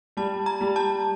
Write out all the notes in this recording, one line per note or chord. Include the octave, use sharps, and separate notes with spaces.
G3 A5
A#5
G3
A5